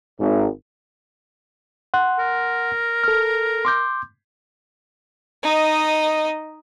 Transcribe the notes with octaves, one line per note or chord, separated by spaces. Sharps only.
G#1
F#5 C6 F#6
A#4
A4 F6
C6 D6 G6
D#4 D#5